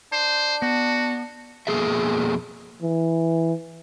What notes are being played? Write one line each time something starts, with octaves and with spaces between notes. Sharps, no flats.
D4 C5
B3 F#4
F2 B2 A#3 G#4 A4 E5
E3